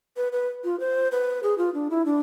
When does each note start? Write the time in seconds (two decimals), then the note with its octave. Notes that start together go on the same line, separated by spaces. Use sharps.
0.17 B4
0.33 B4
0.64 F4
0.80 C5
1.12 B4
1.43 G#4
1.58 F4
1.74 D4
1.90 E4
2.06 D4